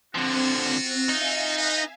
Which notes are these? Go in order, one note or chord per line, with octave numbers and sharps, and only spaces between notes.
D3 F3 C4 F4 F#4
D#4 E5 F5 G#5
B4 D#5